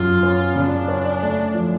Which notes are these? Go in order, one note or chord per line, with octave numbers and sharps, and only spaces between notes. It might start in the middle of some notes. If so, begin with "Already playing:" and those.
Already playing: F#2 F4
C#4
C#3 D4
C#4
A3
F3